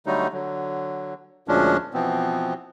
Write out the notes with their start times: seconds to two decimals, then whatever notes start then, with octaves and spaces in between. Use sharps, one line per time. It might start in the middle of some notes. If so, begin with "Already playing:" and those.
0.06 D3 F#3 G3 A3 D#4
0.33 D3 F#3
1.48 D2 A#2 F3 G#3 C#4 D4
1.94 B2 E3 F3 B3 C4